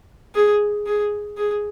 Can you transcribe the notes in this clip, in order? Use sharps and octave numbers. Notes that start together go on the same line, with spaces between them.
G#4
G#4
G#4